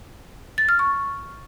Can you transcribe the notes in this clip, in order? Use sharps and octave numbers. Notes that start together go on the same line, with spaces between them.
A6
F6
C#6